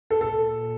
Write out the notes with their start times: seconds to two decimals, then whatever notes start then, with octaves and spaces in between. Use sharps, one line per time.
0.10 A4
0.21 A#2 A4